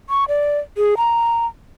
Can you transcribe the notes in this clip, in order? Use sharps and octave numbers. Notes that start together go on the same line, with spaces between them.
C#6
D5
G#4
A#5